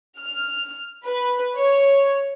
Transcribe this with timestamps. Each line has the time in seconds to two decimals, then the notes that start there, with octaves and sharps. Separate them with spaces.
0.19 F6
1.06 B4
1.58 C#5